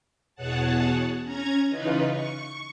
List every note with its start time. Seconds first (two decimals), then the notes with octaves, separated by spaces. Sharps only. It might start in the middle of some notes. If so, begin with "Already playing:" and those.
0.35 E2 B2 G#4 C#5 F#5 A5
1.23 C#4 A#5 G#6
1.68 C#3 E3 D#4 F4 B4
2.07 C#6